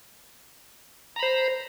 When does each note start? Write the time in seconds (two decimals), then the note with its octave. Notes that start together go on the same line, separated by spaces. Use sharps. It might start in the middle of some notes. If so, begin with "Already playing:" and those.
1.16 A#5
1.19 B5
1.23 C5